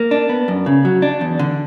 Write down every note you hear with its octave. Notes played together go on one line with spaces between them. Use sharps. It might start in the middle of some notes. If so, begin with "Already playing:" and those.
Already playing: A#3
D4
B3
F#2
C#3
F#3
D4
E2
D3